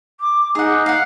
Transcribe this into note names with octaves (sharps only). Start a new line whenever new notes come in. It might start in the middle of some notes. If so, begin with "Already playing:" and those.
D6
D#4 G#4 F#5
F5 F#5